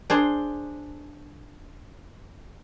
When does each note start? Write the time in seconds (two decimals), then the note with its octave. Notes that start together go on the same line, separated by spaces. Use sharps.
0.10 D4 G#4 C5